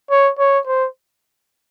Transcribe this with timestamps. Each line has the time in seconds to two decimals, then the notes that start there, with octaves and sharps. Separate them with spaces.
0.11 C#5
0.39 C#5
0.67 C5